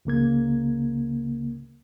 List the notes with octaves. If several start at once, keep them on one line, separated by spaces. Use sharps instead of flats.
C#2 C#3 A#3 G#6